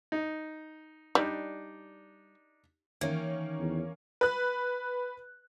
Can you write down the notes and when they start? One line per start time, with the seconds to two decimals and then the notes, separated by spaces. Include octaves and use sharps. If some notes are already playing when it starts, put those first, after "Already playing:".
0.12 D#4
1.15 G3 D4 D#4
3.01 D#3 E3 A#3 C#4
3.59 E2
4.21 B4 F#6